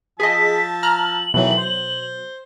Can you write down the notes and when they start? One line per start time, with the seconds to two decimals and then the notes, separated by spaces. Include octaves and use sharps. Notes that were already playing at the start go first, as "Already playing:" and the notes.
0.20 F3 G#4 D#5 A5 E6 B6
0.83 A#5 F6 F#7
1.34 B2 D#3 E3 F#3 A3
1.57 C5